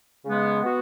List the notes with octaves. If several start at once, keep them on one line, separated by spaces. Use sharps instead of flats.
C#3 G#3 B3
B3 F#4